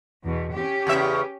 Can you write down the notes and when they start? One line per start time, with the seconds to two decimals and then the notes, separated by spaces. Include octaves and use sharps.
0.23 E2 B2
0.53 C#4 G4
0.87 E2 C#3 E5